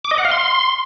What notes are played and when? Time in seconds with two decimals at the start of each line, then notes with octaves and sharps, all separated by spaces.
0.05 D6
0.11 D#5
0.18 F#5
0.25 F5
0.32 C6